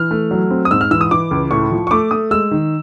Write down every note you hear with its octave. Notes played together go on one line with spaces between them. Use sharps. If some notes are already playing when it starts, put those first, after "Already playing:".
Already playing: E3 F6
A3
F#3
C4
D#6
G#2 E6
F6
E3 E6
D#6
E3 D6
C#2
A2 C#6
F3
C#6
A3 D6
A3 D#6
G#3 E6
D#3